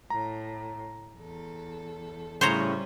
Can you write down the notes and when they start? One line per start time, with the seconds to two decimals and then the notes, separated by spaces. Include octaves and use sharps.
0.10 A2 A#5
1.16 E2 A4
2.41 A2 C#3 G3 C#4 C5 C#5 A#5